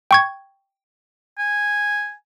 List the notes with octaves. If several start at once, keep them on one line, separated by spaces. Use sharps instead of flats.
G5 C#6 G#6
G#5